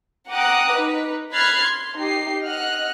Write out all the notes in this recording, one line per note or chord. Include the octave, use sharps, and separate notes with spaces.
F#5 G5 A#5 D6 D#6 F#6
D#4 B4
B5 F6 F#6 G#6 A6 C7
C6
D#4 G4 C7
D#5 F#5 F6 F#6